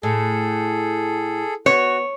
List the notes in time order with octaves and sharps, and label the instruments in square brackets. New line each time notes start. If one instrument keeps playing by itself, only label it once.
[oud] A2 [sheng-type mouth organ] G#4 A4
[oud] B3 [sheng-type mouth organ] F#4 [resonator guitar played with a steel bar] C#5